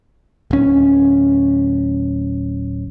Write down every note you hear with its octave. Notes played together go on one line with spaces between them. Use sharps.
D1 C#4